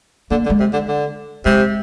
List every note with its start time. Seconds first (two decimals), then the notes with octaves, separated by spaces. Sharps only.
0.31 D3 A#3
0.45 D3
0.50 G#3
0.60 C3
0.73 D3
0.88 D3
1.45 C3 G#3